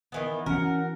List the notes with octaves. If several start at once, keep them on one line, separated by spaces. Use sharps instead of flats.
D#3 E3 B3
E3 C#4 F#4 A#4 F#5